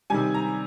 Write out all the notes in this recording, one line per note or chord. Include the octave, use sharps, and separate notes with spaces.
C3 D#3 G3 G#5
A#5